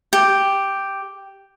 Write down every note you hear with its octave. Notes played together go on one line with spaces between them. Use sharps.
G4